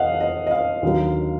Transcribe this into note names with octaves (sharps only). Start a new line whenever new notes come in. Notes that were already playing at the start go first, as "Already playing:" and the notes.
Already playing: F2 D#5 F5 F#5
D#5
D#5
F5
D#2 D3 F#3